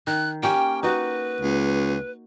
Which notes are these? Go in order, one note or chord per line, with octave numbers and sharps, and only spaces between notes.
D#3 F#6
A#3 C#4 G4 G5
D#4 F#4 B4
C#2